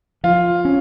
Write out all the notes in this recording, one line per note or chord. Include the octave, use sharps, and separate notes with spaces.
F3 F4
C#4